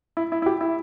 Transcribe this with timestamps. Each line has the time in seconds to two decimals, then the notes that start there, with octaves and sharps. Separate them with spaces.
0.17 E4
0.32 E4
0.42 E4
0.46 G4
0.61 E4